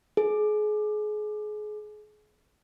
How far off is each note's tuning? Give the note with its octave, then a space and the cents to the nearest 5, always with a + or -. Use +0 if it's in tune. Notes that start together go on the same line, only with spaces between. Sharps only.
G#4 +30